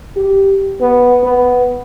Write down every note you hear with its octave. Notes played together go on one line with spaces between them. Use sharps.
G4
B3
B3